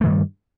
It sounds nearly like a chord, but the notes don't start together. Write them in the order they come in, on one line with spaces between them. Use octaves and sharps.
A3 D#3 G2 G3